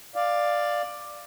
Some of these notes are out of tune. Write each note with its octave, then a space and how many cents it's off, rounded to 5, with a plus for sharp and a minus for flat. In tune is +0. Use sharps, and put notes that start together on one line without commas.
D5 +10 F5 +0